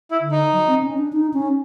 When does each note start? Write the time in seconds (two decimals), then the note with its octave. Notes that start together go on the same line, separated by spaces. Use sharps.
0.11 E4
0.21 D3
0.32 D#4
0.53 F#3
0.67 C4
0.83 C#4
0.98 D4
1.13 D#4
1.33 C#4